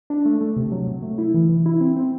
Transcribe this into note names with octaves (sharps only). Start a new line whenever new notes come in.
D4
A3
A3
C3
F#3
C3
A3
E4
E3
E3
E4
C4
C4